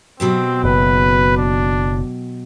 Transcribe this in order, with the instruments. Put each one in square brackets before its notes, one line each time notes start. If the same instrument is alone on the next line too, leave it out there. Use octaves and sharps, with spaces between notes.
[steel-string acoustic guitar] B2 F#3 G4 [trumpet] C4
[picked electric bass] F#1 [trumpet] B4
[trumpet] D4